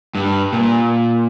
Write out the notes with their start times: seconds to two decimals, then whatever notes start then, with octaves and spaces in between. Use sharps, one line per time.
0.15 G2
0.53 A#2